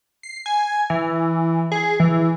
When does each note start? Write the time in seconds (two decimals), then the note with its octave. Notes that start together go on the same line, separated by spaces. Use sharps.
0.23 C7
0.46 G#5
0.90 E3
1.72 G#4
2.00 E3